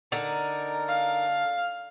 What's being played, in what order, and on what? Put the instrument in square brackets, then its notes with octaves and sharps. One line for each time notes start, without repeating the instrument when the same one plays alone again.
[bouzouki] D3 [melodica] D#4 A#4
[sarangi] F5